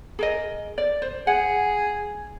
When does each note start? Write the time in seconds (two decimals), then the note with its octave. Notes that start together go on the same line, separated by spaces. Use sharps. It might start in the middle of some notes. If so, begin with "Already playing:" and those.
0.19 G#4 A#4 D#5
0.78 D5
1.02 C5
1.27 G#4 F#5